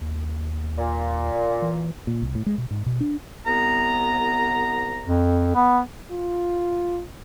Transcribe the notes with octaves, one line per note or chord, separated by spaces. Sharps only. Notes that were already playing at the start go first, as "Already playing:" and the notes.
D#2
A#2
E3
A#2
C2
A2
G#3
B2
G#2
B2
D4
C2 B3 A#5
F2
B3
F4